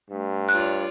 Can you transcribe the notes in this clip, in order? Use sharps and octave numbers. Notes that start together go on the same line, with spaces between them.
G2 A3
F4 C#5 D5 F#6